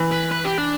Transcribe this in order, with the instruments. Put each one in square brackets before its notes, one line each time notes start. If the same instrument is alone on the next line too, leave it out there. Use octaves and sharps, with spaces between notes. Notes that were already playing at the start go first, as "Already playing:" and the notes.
Already playing: [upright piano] E3
[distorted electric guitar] B4
B4
G4
D4